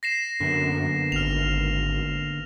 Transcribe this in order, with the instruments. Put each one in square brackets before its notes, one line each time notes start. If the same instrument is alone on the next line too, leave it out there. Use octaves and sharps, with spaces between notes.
[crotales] A#6 C7 E7
[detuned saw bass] F#2 [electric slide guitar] D3 A#3 B3
[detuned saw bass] G#1 [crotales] F6 F7